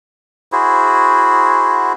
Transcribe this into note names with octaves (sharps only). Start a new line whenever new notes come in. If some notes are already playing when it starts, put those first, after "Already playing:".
E4 F#4 G#4 C5